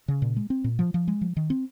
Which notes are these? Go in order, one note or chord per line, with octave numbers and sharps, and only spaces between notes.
C#3
A#2
G#3
C4
A#2
F3
F3
G#3
F3
D#3
C4